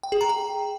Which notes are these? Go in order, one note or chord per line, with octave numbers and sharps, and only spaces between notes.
G5
G#4
A#5
G5